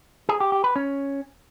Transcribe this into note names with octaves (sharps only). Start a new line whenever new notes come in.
G#4
G4
G4
B4
C#4